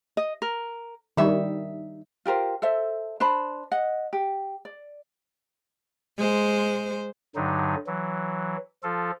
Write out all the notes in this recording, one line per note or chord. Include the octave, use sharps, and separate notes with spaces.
D#5
A#4
D#3 G3 D#4 E5
F4 G4 A#4 C5
A4 C5 E5
D4 C5 A5 B5
D#5 F#5
G4
D5
G#3 C5
G2 D3 F#3 D#4
E3 F#3
F3 F4 A4